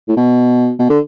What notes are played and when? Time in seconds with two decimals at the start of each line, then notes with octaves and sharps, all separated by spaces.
0.08 A2
0.17 B2
0.79 B2
0.90 D3